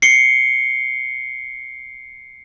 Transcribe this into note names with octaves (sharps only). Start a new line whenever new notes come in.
C7 C#7 G7